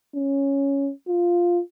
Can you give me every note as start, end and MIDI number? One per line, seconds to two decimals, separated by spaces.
0.15 0.91 61
1.08 1.61 65